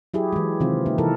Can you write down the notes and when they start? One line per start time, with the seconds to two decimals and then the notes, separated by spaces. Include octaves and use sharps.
0.14 F#3 E4 G4 G#4
0.33 E3 G#3
0.60 C3 D#3 E3 C4 F4
0.86 A#3 D#4 E4
0.98 C3 E3 A4 A#4